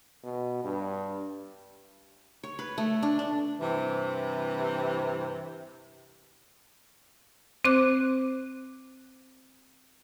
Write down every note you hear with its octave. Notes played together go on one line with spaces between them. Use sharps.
B2
G2
C#5
B4
A3
D4
D4
G2 C3 E3
C4 C5 D6 F#6